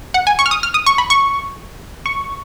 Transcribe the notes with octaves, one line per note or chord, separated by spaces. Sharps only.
F#5
G#5
C#6
F6
D#6
F6
D#6
C#6
B5
C#6
C#6